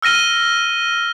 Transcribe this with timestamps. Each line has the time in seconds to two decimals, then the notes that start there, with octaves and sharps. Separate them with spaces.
0.02 E6 F6 A#6 D#7 G7